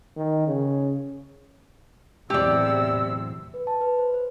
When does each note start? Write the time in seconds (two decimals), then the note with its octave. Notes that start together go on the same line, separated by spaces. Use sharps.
0.16 D#3
0.47 C#3
2.30 E2 A2 C3 F#3 G4 D5 E6
3.54 B4
3.67 A5
3.81 B4
3.99 C5
4.14 C5